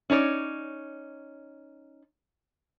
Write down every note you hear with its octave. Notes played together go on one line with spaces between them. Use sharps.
C#4 D#4 C#5 D5